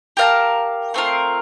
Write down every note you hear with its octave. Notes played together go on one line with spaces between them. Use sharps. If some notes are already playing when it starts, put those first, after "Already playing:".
G4 A#4 F5 A5
A3 C4 F4 A#4